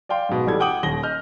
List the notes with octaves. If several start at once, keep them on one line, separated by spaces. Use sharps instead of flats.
D5 F5 G5 C6
G#2 B2
A1 G3 A4 G#6
F#5 G5 D6 D#6 F#7
D#1 D#2 A#6 G7
D#5 F6 G6